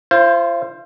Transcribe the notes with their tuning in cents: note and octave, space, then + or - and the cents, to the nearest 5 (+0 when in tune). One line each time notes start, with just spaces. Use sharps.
F4 -40 C5 +10